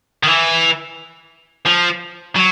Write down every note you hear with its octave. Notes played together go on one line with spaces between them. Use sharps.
D#3
E3
F3
F#3